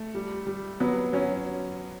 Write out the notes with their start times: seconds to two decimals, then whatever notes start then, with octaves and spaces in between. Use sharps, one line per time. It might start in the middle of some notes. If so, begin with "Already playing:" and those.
Already playing: A3
0.15 G3
0.47 G3
0.80 F#3 B3
1.13 F#3 C#4